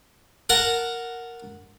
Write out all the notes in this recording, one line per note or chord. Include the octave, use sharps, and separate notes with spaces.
A#4 F#5 A5 A#5